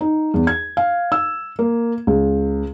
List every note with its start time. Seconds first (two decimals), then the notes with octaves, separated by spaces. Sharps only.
0.01 D#4
0.34 E2
0.47 G#6
0.77 F5
1.12 E6
1.59 A#3
2.07 C#2